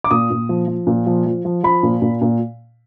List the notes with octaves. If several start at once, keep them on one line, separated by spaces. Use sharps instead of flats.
D6
A#2 D#6
A#2
F3
F3
A#2
F3
F3
F3
F3 B5
A#2
A#2
A#2